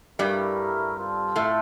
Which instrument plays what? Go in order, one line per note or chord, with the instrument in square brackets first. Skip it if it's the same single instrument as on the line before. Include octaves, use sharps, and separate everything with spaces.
[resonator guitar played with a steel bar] G2 G3 [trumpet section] A3 E4 A#4
[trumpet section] C4 F4 A4
[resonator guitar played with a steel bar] A2 A3